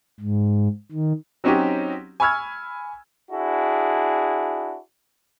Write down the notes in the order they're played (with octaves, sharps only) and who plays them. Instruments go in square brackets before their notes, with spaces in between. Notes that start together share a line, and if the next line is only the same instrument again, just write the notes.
[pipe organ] G#2
D#3
[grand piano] F#3 C4 C#4 D#4 F#4 G4
G#5 B5 C#6 E6 F6 G#6
[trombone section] D4 E4 F#4 G#4